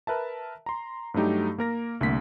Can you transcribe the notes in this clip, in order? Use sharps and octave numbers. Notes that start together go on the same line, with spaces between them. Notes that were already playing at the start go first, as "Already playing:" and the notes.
A#4 B4 E5 A5
A#5 C6
G2 F#3 A3 D#4 G4
A#3 A#4 A#6
C2 D3 A3 A#3 B6